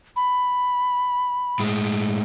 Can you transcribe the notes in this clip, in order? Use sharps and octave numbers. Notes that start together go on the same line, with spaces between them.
B5
A2 G#3